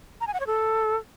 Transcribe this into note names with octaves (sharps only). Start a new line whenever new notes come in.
A#5
G#5
F#5
C#5
A4